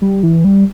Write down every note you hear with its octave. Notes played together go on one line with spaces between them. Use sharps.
G3
E3
G3